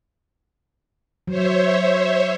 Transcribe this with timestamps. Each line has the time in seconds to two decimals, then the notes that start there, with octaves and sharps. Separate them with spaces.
1.28 F#3 C5 C#5 E5